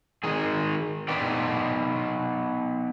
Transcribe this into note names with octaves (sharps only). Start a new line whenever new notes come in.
D#3 G#3 G#4
B3 D#4 B4 D5 G5